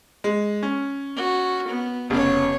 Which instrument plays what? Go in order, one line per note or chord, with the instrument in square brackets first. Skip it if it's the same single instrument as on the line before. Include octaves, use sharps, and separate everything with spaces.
[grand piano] G#3
C#4
[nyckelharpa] F#4
B3
[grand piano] F1 C#3 [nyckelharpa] B3 C#5